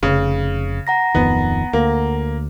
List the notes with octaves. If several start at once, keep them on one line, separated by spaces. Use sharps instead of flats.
F1 C#3
F#5 A#5 A#6
D1 F2 D#3 B3
D2 A#3